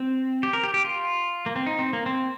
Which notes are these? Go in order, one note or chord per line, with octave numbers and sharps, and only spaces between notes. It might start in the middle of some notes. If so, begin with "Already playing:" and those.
Already playing: C4
G4
A#4
G4
G4
F4
A#3
C4
D#4
C4
A#3
C4